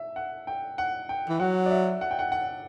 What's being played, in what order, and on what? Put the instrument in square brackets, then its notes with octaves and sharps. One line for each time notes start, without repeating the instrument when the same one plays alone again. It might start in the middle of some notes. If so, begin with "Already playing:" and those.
Already playing: [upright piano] E5
F#5
G5
F#5
G5
[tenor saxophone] E3
[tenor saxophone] F#3 [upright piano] F#5
[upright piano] D5
E5
F#5
G5
F#5
F#5